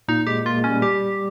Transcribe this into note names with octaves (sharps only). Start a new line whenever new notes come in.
A#2 D#4
G#3 G4
A#3 F4
G#3
C#4
G3
G3 G4